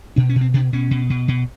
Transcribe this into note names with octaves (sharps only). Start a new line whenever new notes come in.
B2 D4
C#4
B2
C4
B2 D4
B2 C#4
B2
B2
B2